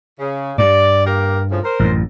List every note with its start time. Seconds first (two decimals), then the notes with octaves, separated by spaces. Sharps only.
0.19 C#3
0.58 G2 D5
1.06 A#3 G4 A#4
1.50 A2 C#3 F3
1.64 A#4 C5
1.80 A1 F#2